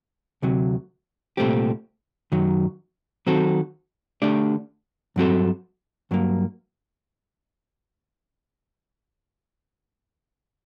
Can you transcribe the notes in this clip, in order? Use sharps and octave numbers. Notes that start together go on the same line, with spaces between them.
D2 C3 F#3
C2 A#2 A3 C4 G4
F#2 D#3 F#3
D#3 F#3 C4 F#4 A4
D3 A3 D4 G4 D5
G2 F#3 C4 F#4 A4
G2 F#3 A#3